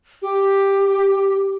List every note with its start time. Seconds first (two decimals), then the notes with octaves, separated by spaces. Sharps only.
0.22 G4